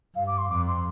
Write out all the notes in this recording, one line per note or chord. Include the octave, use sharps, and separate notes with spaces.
G2 F5
D6
C6
F2 D6
C6